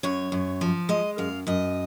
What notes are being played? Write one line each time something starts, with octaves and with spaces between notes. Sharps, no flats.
F#2 C#5
F#2
F3
G#3 D#5
F#2 F5
F#2 D#5